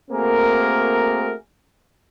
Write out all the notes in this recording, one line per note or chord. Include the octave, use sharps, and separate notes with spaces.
A3 A#3 C4 F#4 G#4 A#4